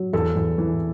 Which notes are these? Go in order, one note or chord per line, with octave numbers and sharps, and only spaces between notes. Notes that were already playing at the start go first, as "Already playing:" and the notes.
Already playing: F#3
E2 A4
E2
E3